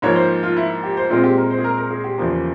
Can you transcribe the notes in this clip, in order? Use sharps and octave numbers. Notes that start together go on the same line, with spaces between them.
G#2 F3 A#3 C#5
C5
F4
E4
G4
C5
A#2 G#3 C4 F4
G4
A#4
C5
G#4
A#4
A#4
G#4
G4
E2 C#3 F3 A#3